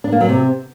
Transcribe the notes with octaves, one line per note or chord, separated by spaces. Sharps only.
D4
A#3
F#3
C3